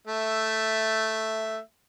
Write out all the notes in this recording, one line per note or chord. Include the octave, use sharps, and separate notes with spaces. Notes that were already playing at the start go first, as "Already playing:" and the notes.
A3 E5